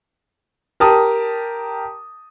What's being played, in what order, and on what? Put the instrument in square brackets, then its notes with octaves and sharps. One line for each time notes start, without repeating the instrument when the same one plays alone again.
[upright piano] G4 A#4 A5 A#5 D#6